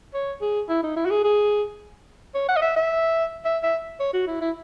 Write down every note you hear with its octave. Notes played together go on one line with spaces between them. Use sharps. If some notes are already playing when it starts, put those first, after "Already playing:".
C#5
G#4
E4
D#4
E4
F#4
G#4
G#4
C#5
F#5
D#5
E5
E5
E5
E5
C#5
F#4
E4
E4